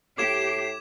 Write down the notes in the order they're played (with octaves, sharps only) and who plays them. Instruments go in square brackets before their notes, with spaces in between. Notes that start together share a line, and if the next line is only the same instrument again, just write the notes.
[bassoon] A2 [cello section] G4 [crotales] D6 G#6 E7 [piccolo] C7